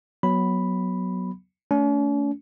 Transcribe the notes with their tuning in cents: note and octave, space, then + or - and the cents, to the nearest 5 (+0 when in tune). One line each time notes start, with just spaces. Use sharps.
F#3 +0 B3 -10 B5 +0
A3 +0 C#4 +45